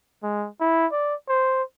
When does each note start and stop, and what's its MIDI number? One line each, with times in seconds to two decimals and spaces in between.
0.23 0.48 56
0.61 0.87 64
0.92 1.15 74
1.29 1.63 72